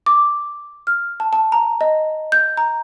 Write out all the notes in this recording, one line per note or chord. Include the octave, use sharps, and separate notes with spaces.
D6
F6
A5
A5
A#5
D#5
G6
A#5